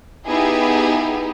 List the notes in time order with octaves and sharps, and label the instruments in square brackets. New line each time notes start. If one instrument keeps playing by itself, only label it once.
[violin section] B3 D#4 E4 G4 G#4